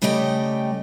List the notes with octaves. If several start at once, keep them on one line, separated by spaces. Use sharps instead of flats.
C#3 G3 A3 G4 D#5 G5